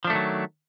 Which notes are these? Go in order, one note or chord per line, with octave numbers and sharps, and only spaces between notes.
D#3 F3 F#3 A3 D4